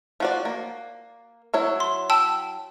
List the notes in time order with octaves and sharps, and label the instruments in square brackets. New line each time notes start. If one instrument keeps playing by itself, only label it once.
[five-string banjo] F3 F#4 D5
A#3
F#3 E4 C#5
[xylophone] C6
G5 A5 E6